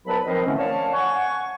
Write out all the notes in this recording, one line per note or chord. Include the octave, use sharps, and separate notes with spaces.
C2 F#3 B3 B4 A5 B5
D#3 F3 C4 A#4 C5 D#5
A2 D3 E3 A3 C4 C#4
C#5 D5 F5 A5
F#5 G#5 C#6